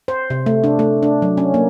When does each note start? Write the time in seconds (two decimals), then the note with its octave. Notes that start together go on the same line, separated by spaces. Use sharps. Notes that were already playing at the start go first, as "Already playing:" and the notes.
0.08 C5
0.30 C3
0.46 A3
0.64 D4
0.79 A3
1.03 D4
1.22 F#3
1.37 C#4
1.54 A#3